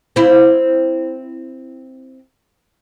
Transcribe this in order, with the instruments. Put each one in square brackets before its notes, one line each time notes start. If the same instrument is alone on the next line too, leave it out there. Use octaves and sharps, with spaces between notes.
[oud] C4 E4